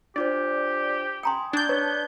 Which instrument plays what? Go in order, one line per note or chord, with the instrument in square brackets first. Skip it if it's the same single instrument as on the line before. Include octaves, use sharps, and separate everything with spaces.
[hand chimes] D4 F4 C5 [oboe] G4 [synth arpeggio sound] D5
[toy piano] G5 A#5 C6 [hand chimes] G#5 D#6
[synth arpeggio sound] D4 G6 [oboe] D5 [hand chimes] G#6
[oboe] B3 [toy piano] B4 C#5 C#6